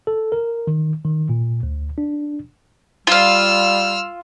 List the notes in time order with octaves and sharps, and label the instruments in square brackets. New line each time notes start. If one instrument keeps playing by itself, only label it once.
[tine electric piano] A4
A#4
D#3
D#3
A#2
D2
D4
[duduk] G3 [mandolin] F4 F5 [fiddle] E6 F6